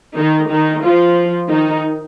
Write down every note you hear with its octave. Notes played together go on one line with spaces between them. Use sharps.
D#3 D#4
D#3 D#4
F3 F4
D#3 D#4